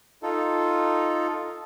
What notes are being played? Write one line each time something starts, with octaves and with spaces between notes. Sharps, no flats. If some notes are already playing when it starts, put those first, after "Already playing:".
D#4 F4 A4